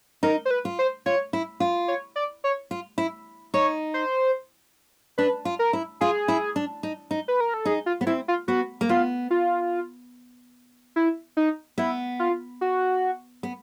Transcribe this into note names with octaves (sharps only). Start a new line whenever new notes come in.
D#4 A#4
C5
B4
F4
C5
F4 C#5
E4
F4
C#5
D5
C#5
F4
E4
D#4 C#5
C5
D4 B4
F4
A#4
E4
F4 G#4
E4
D4
D#4
D#4
B4
A#4
A4
D#4 G#4
F4
B3
C4 E4
F4
B3 F#4
A#3
B3 F4
F4
E4
D#4
B3 E4
F4
F#4
B3